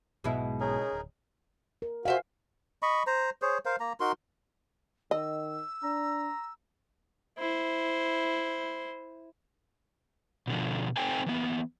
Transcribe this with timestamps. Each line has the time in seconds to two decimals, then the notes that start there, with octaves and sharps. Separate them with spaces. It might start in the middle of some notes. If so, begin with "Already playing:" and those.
0.24 B1 G#2 B2 G#3 B3 E4
0.60 C#3 D#4 G#4 A#4
0.93 D1
1.82 A#4
2.05 F#4 C5 E5 F5 G#5
2.82 D#5 B5 C#6
3.07 C5 A#5
3.42 G#4 C5 C#5
3.65 A#4 C5 F5
3.80 A#3 A#5
4.00 D#4 F#4 A#4 C6
5.11 D#3 D#5 E6
5.83 D4 A#5
7.38 E4 C5
10.47 B2 D3 F3
10.97 C4 D#4 A4 C5 G5 G#5
11.26 E3 A#3 B3